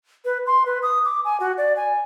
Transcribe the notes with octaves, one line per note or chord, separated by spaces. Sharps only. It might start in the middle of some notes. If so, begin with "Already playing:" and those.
B4
C6
B4
D#6
D6
G#5
F#4
D5
G#5